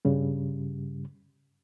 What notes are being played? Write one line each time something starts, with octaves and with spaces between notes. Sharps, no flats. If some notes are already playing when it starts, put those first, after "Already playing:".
G2 C#3 G3